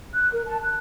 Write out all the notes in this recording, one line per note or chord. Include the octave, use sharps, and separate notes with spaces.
F#6
A#4
A5
F#6